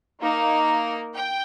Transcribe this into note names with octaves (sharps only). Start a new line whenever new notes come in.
A#3 D#4 A#4
G5